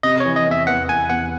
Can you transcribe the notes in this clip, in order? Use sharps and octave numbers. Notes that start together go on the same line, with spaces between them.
C3 D#5
E3 C#5
D#5
E2 E5
E2 F#5
E2 G#5
E2 F#5